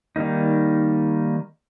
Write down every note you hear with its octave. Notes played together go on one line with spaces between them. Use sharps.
D#3 G3 A#3 D#4